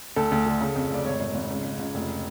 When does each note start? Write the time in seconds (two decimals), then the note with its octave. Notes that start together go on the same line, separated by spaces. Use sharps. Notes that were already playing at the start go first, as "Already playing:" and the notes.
0.16 D2 A4
0.32 D2
0.46 D3
0.61 C#3
0.76 F2
0.91 F1 D5
1.05 G#1 C#5
1.20 G#1
1.35 G#1
1.50 C#2
1.65 C#2
1.79 C#2
1.94 F1